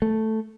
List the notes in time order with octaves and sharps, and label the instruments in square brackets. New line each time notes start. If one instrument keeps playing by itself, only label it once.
[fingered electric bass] A3